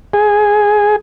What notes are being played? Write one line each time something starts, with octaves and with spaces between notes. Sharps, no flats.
G#4